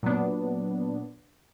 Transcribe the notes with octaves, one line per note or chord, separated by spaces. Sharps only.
A#2 F#3 B3 D4